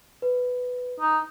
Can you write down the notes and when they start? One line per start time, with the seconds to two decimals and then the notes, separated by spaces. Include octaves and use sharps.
0.22 B4
1.00 D#4